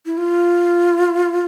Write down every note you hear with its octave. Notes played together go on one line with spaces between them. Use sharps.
E4
F4